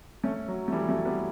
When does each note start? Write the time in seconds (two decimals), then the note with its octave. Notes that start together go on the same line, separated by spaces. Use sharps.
0.24 A3 C#4
0.48 F#3
0.68 A3
0.72 E3 G3
0.89 F#3 A3
1.05 G3 B3